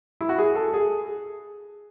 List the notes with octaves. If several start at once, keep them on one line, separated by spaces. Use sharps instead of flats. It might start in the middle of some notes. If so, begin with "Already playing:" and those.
E4
F#4
G#4
A4
G#4